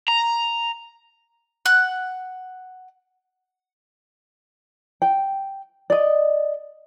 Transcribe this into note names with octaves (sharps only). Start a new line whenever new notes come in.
A#5
F#5 F#6
G5
D5 D#5